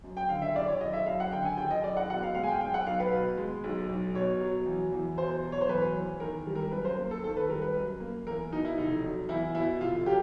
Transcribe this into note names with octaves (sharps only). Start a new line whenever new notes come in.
F#2
G5
D3 F5
E5
F#1 D5
C#5
F#1 D#5
E5
F#2 F5
F#5
D3 G5
G#5
F#1 G5
D#5
F#1 D5
F#5
B2 F#5
F5
G#3 F5
G#5
G5
B1 G5
F#5
B1 F5
B4
B2
G#3
B1
B1
B2 C#5
F#3
E2
E2
B2 C5
F#3
C#5
C5
E2 B4
E2
D#3 A#4
G3
A#4
F#2 B4
C5
A#3
A4
D#3 A4
B4
G3 A#4
B4
F#2
A#3
E2 A#4
B2 D#4
E4
F1 D#4
F#3
E2 E4
B2 E4
F1 F4
F#3 G4